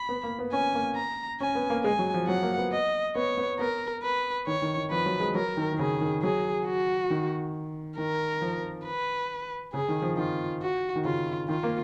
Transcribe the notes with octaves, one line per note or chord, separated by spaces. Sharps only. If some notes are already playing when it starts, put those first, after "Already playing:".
Already playing: B5
B3
A#3
B3
C#4 G#5
A#3
A#5
C#4 G#5
B3
A#3
G#3 G#5
F#3
F3
F#3 F#5
A#3
B3
D#5
B3 C#5
B3
B3 A#4
B4
D#3 C#5
D#3
D#3
F3 B4
F#3
G#3
F#3 A#4
D#3
D#3
C#3 G#4
D#3
F#3 G#4
F#4
D#3
D#3 A#4
F3
B4
C#3 G#4
D#3
F3
D#3 F4
F#4
D#3
C#3 F4
D#3 F4
A#3